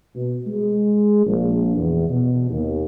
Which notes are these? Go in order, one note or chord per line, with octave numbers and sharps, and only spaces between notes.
B2
G#3
A#1
E2
B2
D#2